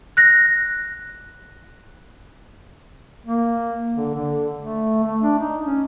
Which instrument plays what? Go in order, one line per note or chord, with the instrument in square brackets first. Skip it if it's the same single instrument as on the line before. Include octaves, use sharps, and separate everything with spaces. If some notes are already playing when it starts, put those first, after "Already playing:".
[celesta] F#6 A#6
[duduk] A#3
D3
D3
A3
A3
D4
D#4
C#4